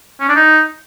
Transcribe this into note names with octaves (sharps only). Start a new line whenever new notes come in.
C#4
D4
D#4